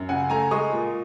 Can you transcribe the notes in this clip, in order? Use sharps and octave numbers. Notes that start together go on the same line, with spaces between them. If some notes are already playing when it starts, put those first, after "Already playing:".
Already playing: F#2
C#3 F#5 G#5
A3 G#5 A#5
G#3 C#6 D#6
A#2